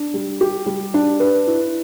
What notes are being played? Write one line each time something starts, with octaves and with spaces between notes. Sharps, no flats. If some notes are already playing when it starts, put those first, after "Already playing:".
Already playing: D4
G3
G4
G3
D4
B4
E4